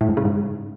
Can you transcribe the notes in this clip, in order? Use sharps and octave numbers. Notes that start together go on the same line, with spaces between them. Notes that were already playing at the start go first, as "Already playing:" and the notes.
A2
G#2
C#3
G#2